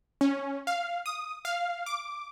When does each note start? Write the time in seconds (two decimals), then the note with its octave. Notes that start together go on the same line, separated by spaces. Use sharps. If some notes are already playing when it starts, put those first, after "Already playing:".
0.21 C#4
0.67 F5
1.06 D#6
1.45 F5
1.86 D6